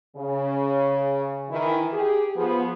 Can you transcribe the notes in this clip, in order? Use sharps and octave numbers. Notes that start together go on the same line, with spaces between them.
C#3
D#3 E3 E4
G4 G#4
F3 B3 G#4